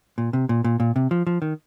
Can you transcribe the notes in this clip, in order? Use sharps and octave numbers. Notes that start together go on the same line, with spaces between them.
A#2
C3
A#2
A#2
A#2
C3
F3
F3
D#3